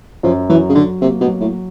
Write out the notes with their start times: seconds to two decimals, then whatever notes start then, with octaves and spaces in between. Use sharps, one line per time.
0.23 F#2 F3
0.49 E3 F#3
0.69 C#3
0.75 D3 F#3
1.01 C3 A#3
1.21 B2
1.27 F#3
1.41 A2